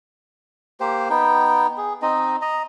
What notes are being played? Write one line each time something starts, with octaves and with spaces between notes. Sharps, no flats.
A#3 G4 C5
B3 D#4 G5
G#4
C4 D#4 D#5
D#5 A#5